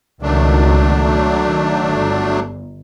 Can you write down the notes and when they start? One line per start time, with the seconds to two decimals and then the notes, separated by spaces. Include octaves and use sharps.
0.22 C#2 B2 D#3 F#3 A3 D4
1.42 D#3
1.86 G1